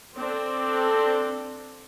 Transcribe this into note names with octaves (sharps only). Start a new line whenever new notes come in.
C4 D4 A4